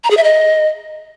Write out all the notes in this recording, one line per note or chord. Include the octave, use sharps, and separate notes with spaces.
A#5
G#4
E5
D#5